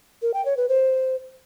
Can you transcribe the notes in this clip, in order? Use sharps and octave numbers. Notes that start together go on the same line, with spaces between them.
A#4
G5
C#5
B4
C5